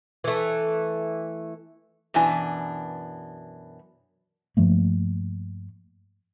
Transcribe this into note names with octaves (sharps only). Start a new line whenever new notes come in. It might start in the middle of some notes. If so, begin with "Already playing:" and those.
E3 A3
F#2 B2 E3 D4 G#5
G2 F3 A3 A#3